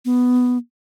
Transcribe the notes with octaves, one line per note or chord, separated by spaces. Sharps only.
B3